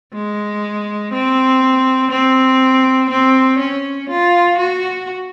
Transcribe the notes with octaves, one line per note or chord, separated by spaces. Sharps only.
G#3
C4
C4
C4
C#4
F4
F#4